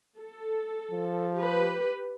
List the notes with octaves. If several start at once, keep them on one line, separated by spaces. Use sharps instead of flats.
A4
F3
G4 B4